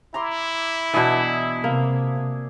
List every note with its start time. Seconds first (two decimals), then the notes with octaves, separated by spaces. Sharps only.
0.14 E4 A#5 C6 D6
0.93 B2 E3 D4 G#4 E5
1.64 C3 A#3